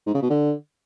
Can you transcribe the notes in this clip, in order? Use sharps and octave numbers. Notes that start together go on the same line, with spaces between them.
G#2
C#3
B2
D3